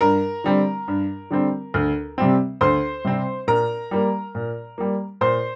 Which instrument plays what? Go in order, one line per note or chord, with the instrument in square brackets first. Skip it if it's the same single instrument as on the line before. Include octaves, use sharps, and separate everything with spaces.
[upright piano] G2 A#4 A#5
D3 G3 C4
G2
D3 G3 C4
D2
C3 G3 C4
D2 C5 C6
C3 G3 C4
A#2 A#4 A#5
G3 A#3
A#2
G3 A#3
A#2 C5 C6